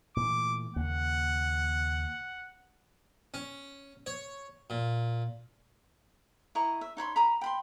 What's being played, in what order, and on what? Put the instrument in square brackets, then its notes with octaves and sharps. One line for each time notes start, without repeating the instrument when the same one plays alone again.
[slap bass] A#2 E3 A3 [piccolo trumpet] D6
[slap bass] D#2 C#3 A#3 [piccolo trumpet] F#5
[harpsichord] C#4
C#5
A#2
[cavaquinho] E4 D#5 A#5 C#6
E5
D#4 C#5 B5 C6
A#5 B5 D#6
G5 B5 C6